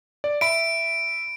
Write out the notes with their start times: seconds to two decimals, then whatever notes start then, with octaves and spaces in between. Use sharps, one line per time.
0.24 D5
0.41 E5 B5 D7